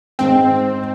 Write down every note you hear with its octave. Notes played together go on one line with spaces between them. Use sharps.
G#2 C4 G5